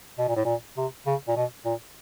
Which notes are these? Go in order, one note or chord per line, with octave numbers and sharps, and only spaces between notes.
B2
A#2
A2
A#2
C3
C#3
A#2
B2
A#2